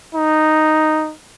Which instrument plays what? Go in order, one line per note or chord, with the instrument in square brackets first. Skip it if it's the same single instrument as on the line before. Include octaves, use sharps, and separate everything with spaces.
[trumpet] D#4